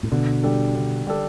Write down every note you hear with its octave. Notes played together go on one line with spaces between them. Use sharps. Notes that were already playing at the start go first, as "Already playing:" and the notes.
A2
B2 D3
G3 D4 A4
D3
G3 D4 A4